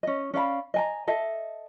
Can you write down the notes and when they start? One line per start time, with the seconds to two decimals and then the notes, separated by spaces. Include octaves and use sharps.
0.03 C#4 D#5
0.34 C#4 D5 F5 B5
0.74 D#5 G#5 A#5
1.07 A4 D#5 E5